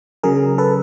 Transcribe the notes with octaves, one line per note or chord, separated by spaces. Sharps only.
C#3 F#3 G#4 A#4
A4 B4